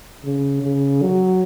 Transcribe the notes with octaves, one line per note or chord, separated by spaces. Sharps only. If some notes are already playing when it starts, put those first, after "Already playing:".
C#3
C#3
F#3